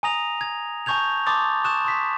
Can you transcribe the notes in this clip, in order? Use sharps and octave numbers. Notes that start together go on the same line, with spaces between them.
G#5 A#5 D#6 A#6 F7
G#6
G#5 A5 C#6 G6 G#6 F7
A5 C6 D6 D#6 A6
C#6 D#6 F#6 E7
C6 D#6 B6